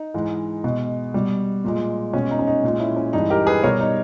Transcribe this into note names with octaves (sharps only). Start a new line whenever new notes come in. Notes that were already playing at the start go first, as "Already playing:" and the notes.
Already playing: D#4
G#2 E3 G#3
B2 G#3
B2 G3
A#2 G#3
B2 G#3 C#4
D#4
C#4
D#4
A#2 G#3
C#4 E4
C#4
G2 E3 G#3 D#4
G4 A#4
G#4 B4
B2 G3 A#4 C#5
D#4